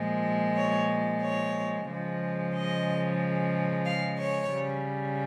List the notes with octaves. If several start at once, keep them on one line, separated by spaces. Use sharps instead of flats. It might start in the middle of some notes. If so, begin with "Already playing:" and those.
Already playing: A#2 F3 G#3
C#5
C#5
C#3 F3 G#3
D#5
F5
C#5
C#3 G3